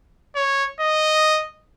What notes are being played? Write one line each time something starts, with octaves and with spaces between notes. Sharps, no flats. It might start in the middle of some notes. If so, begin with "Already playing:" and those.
C#5
D#5